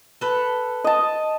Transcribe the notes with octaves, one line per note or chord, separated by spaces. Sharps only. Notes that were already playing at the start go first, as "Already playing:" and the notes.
A4 B4
D#5 A5